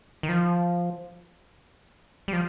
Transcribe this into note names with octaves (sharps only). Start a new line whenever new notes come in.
D#3
F3
G3
F3